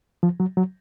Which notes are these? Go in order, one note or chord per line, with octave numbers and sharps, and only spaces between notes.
F3
F#3
F#3